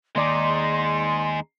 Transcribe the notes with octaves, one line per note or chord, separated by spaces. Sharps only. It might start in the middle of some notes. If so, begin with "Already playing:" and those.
D#2 G#3 D#4 D5 C6